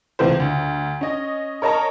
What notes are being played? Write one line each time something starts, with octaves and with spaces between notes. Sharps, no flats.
C#2 C3 E3 A3 C5
D2
C#4 D#5
A#4 C#5 D#5 A5 A#5